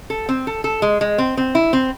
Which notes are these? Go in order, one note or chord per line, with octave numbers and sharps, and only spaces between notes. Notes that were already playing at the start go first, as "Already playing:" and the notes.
A4
C4
A4
A4
G#3
G#3
C4
C4
E4
C4